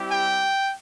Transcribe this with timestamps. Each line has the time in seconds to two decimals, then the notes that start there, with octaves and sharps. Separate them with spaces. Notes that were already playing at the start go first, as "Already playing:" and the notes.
Already playing: G3 C4 E4 G4
0.09 G5